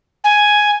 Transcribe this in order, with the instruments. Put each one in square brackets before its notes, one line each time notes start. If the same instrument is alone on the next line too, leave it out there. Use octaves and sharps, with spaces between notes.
[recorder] G#5